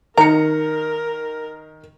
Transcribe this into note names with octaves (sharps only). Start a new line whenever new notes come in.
D#3 A#4 A#5 C#7